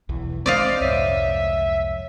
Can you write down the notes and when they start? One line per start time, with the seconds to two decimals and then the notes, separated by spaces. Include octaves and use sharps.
0.09 B1 E2 E3
0.46 G#3 A#3 C4 C5 D5 D#5 F5
0.81 C2 F2 G#2 C#5 E5 B6 D#7